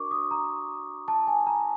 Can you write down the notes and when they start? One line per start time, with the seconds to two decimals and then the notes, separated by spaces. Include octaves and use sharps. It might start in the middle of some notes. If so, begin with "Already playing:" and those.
Already playing: D4 F#4 A#4 D5 C#6 D6
0.11 D#6
0.31 A#5
1.08 A5
1.27 G#5
1.47 A#5